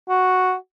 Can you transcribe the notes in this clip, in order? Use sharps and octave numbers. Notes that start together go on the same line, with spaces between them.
F#4